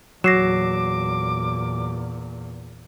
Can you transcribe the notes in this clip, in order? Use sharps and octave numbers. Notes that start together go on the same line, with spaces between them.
E2 A#2 F#3 D6 A#6 C7 E7